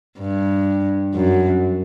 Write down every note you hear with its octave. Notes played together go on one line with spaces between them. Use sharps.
G2
F#2